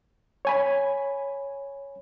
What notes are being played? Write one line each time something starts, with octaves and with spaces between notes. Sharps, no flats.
C#5 G#5 B5